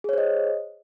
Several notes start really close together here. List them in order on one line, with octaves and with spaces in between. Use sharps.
G#4 C#5 C5 D#5